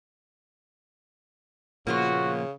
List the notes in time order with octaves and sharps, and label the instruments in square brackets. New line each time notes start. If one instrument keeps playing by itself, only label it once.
[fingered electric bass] A#2 F3 [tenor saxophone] C#3 [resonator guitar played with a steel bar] A#3 B3 F4 [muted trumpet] F#4